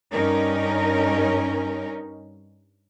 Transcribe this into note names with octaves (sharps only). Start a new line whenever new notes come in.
G2 C#4 D#4 A#4